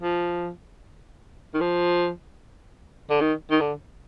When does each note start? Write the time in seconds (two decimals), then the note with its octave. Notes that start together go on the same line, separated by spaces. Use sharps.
0.01 F3
1.54 D#3
1.61 F3
3.10 D3
3.21 D#3
3.51 D#3
3.61 D3